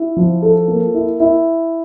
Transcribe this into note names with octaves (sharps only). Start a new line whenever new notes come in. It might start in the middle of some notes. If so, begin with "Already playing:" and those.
Already playing: E4
F3
A4
A#3
E4
E4